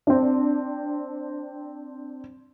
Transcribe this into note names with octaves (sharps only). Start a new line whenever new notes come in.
C4 D4